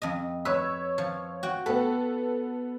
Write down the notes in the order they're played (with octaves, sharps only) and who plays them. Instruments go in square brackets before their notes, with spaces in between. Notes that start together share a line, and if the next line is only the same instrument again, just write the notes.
[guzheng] F2 D#5
[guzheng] B4 [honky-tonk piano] C#5 E6
[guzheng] F3
F#4 G5
[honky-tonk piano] B3 A4 [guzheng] B4